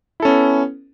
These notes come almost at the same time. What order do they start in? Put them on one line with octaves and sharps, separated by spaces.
E4 A4 C#4 B3